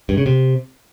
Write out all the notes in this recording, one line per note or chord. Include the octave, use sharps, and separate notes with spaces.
G2
C#3
C3